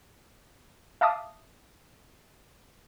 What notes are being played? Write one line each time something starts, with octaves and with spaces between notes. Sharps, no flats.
E5 F5 A5 D6 D#6